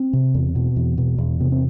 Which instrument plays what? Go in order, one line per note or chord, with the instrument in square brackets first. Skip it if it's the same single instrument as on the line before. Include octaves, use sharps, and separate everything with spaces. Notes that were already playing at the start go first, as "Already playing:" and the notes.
Already playing: [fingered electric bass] C4
C3
E2
B2
E2
B2
E2
C3 B3
C4